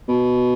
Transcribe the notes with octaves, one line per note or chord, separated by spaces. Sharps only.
B2